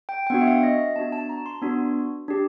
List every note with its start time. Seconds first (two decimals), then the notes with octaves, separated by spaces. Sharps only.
0.09 G5
0.27 G5
0.30 B3 D4 F#4 F#5
0.41 E5
0.47 F5
0.63 D#5
0.80 E5
0.96 B3 D4 F#4 A5
1.12 A5
1.29 A#5
1.46 C6
1.62 B3 D4 F#4
2.28 D4 G4